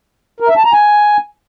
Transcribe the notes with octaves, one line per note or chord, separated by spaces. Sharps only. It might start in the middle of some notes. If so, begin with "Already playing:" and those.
A#4
E5
A5
A#5
G#5